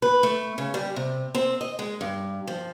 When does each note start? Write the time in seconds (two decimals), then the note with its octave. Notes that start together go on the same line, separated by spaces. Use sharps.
0.02 B4
0.23 A3
0.58 C#3
0.74 G3
0.96 C3
1.35 C4
1.61 D#5
1.79 G#3
2.01 G2
2.47 F3